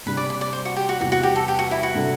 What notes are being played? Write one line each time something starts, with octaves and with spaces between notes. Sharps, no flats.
C3 G3 D4 G4 B4
D5
D5
D5
C5
F#4
G4
F#4
E2 C3 G3 F#4
F#4
G4
A4
G4
F#4
E4
F#4
C3 G3 D4 A4